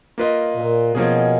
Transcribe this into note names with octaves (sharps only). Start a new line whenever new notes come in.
A#3 F4 B4 D#5
A#2
B2 F3 A#3 C#4 G#4